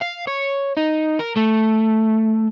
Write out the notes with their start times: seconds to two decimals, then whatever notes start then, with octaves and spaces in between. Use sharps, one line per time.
0.01 F5
0.27 C#5
0.77 D#4
1.20 A#4
1.37 A3